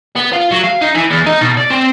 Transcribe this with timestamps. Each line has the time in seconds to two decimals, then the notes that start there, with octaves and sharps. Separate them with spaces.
0.16 B3
0.33 F4
0.51 F#3
0.64 F5
0.81 D#4
0.95 E3
1.11 E2
1.26 D#4
1.41 B2
1.57 D5
1.70 C4